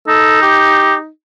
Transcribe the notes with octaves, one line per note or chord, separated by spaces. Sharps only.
D#4 A4
G4